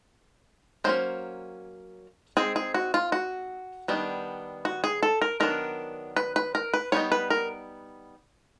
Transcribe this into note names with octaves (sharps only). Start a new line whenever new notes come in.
F#3 A#3 C#4 C5
G#3 C4 D#4 G#4
G#4
F#4
F4
F#4
D#3 G3 B3 D4
F#4
G#4
A4
A#4
D#3 F#3 B3 D4 A#4
B4
B4
A#4
B4
G3 B3 D#4 C#5
B4
A#4